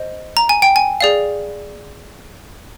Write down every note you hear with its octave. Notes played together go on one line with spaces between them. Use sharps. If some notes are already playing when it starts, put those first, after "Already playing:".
Already playing: C5 D#5
A#5
G#5
G5
G#5
G#4 D5 F5